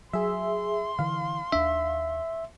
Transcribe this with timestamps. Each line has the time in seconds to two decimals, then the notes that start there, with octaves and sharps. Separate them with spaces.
0.13 F#3 G#4 E5 C6
0.99 D3 E3 F5
1.52 D#2 D4 E5